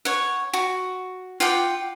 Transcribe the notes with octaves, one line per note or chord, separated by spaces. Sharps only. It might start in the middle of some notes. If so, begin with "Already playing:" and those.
C#5 F#5
F#4
F4 F#5 G5 D6